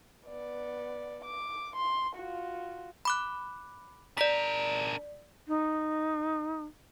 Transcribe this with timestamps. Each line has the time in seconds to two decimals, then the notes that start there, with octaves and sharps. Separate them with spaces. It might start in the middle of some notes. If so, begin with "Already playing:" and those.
0.27 B3 D5
1.25 D6
1.76 C6
2.16 F4 F#4
3.05 B5 D6 F#6
4.18 D4 A#4 D5 B6
5.48 D#4